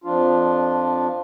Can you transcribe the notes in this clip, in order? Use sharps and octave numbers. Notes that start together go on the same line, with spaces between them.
F2 F3 D4 F4